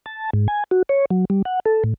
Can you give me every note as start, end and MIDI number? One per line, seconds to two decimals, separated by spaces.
0.06 0.30 81
0.33 0.48 44
0.48 0.64 80
0.71 0.83 66
0.89 1.05 73
1.10 1.25 54
1.30 1.42 55
1.45 1.60 78
1.65 1.84 69
1.84 1.94 45